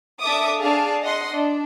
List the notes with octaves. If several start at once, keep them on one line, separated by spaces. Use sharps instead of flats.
D4 A4 E5 D6 D#6
D4 G#4 F5 A5
D#5 F#5 C6
D4